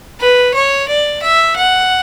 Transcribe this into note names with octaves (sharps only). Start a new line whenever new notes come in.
B4
C#5
D5
E5
F#5